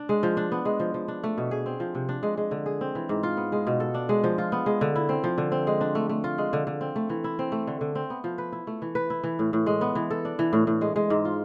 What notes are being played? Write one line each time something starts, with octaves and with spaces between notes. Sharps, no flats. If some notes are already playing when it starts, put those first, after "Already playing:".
Already playing: D4
G#3
F3
D4
B3
G#3
F3
F3
D4
A3
B2
G#4
C4
F3
C3
D4
G#3
G#3
D3
G#4
C4
E3
G#2
F4
B3
G#3
B2
A4
D4
G#3
F3
F4
B3
G#3
D3
E4
C4
F3
D3
C4
G#3
D4
A3
A3
F4
G#3
D3
D3
C4
A3
E3
E4
C4
A3
D3
D3
C4
B3
F3
B4
E4
A3
E3
B4
E4
E3
A2
A2
G#3
B3
E3
A4
D4
E3
A2
A2
G#3
G#3
G#2
F4